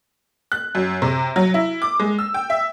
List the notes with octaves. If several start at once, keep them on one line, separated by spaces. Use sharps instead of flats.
F#6
F#2
C3
F#3
E4
D6
G#3
E6
G5
E5